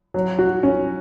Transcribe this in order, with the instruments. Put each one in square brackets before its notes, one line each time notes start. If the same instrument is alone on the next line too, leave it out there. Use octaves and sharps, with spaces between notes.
[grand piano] F#3
F#4
C#4